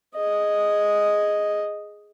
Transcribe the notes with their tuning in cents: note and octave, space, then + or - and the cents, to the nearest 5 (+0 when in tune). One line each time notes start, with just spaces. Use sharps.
G#4 +0 D#5 +0